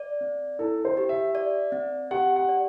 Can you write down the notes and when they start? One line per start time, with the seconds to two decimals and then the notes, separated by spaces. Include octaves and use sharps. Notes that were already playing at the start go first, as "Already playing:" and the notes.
Already playing: D5
0.21 C4
0.59 E4 A4
0.85 C5
0.97 G4
1.09 E5
1.35 D5
1.72 C4
2.11 G4 F#5
2.36 F#5
2.49 D5